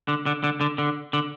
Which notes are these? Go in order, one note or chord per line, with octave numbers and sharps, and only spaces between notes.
D3
D3
D3
D3
D3
D3